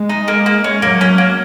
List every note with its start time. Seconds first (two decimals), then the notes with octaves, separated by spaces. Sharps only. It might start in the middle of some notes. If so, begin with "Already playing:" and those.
Already playing: G#3
0.09 D#4
0.28 A#3
0.46 A#3
0.64 C#4
0.82 F#3 A#3
1.01 C#4
1.18 A#3